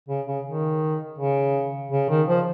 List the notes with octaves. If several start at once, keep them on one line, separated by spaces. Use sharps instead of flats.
C#3
C#3
D#3
C#3
C#3
D#3
F3